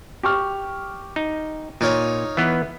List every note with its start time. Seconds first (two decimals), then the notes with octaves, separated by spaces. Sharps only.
0.23 G4 C#6 F6
1.16 D#4
1.81 A#2 D#4 F4 C#5
2.37 E3 B3